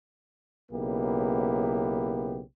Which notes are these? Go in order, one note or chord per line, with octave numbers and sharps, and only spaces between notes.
B1 C#3 A#3 B3 E4 G4